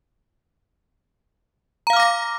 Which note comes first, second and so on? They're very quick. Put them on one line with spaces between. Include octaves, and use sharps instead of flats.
A#5 F5 F6 D6 A#6